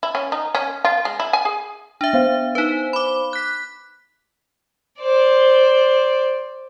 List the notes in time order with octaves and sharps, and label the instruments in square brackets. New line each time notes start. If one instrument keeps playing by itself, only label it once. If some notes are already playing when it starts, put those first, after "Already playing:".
[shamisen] E4
C#4
D#4
C#4
F4
G#3
E4
G#5
G#4
[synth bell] D4 E5
[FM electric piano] B3 C5 F5
[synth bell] D#4 B4
B5 D6
F#6 B6
[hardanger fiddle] C5 D5